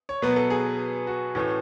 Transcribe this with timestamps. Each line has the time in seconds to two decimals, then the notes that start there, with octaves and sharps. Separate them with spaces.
0.09 C#5
0.22 B2 F#3 B3 B4
0.36 A4
0.50 G#4
1.07 F#4
1.35 A2 E3 A3 C#4